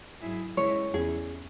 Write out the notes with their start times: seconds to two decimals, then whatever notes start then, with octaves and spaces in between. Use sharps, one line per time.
0.21 G#2 F#3 E4 G#4
0.57 C#3 E3 G#3 E4 C#5
0.94 E2 E3 C#4 G#4